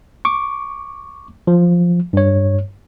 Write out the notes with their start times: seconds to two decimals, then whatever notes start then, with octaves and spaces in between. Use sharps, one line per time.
0.25 C#6 D6
1.47 F3
2.13 G2 C#5